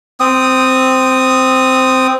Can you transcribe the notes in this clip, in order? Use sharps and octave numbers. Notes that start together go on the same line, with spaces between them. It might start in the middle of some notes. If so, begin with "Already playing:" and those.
C4 D#6